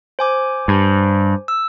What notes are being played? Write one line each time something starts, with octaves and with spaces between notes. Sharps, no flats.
C5 G#5 D6
G2
E6